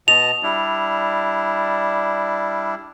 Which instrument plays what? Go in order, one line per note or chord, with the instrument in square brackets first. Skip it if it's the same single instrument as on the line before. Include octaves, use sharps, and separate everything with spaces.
[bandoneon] B2 D#5 A5 [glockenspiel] F7
[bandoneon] G3 D4 E4